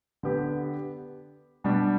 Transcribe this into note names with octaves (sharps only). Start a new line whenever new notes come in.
D3 B3 G4 B4
B2 G3 D4 G4